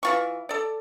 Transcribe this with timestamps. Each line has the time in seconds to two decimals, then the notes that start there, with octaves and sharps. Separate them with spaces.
0.03 E3 F4 C#6
0.49 A4 D5